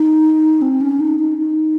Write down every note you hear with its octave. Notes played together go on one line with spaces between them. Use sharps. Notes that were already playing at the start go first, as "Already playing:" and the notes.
Already playing: D#4
C4
C#4
D#4
D#4
D#4